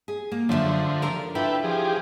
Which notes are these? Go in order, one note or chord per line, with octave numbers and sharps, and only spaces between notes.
G#4
A#3
F#2 D3 F3 G4 E5
A4 A#4
D4 E4 F4 B4 E5 G5
F3 G4 G#4